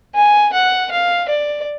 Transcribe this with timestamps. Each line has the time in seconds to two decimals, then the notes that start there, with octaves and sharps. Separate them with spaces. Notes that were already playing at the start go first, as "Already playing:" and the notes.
0.15 G#5
0.53 F#5
0.91 F5
1.29 D5